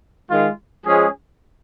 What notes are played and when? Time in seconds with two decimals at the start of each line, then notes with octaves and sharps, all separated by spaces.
0.28 D#3 G#3 F4
0.86 F3 G#3 C#4 G#4